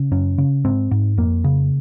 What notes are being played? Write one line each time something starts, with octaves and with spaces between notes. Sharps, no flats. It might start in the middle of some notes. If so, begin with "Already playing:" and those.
Already playing: C#3
F#2 C#4
C#3
G#2 C4
G#2
F2 A#3
C#3